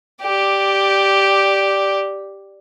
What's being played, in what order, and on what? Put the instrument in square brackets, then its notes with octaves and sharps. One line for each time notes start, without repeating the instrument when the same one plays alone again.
[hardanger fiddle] G4 D5